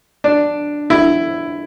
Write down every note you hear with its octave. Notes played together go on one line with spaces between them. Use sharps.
D4
E4